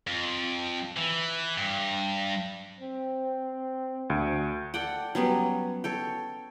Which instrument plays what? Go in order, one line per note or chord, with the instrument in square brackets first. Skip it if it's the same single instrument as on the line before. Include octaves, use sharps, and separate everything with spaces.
[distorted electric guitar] F2
E3
G2
[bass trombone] C4
[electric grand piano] D2
[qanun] A4 D5 F#5 G5
F#3 G3 B3 C#4
A4 C#5 G5